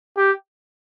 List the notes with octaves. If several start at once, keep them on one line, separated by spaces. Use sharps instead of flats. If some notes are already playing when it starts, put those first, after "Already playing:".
G4